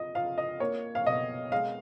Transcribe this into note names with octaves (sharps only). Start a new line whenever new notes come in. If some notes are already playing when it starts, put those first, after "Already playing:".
Already playing: F4 D#5
F4 F5
D#5
A#3 C#5
F5
B2 D#5
G#3 F5